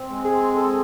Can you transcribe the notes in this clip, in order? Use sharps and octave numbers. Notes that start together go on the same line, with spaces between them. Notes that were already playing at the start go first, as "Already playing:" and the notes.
Already playing: C4
G#3
G#4
C4
A4